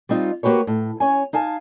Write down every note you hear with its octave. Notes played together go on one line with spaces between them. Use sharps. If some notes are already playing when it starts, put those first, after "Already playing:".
G3 C4 D#4 F4
A#3 F#4 G4 B4 C#5
A2
C#4 C#5 G#5
D#4 F5 G#5 A5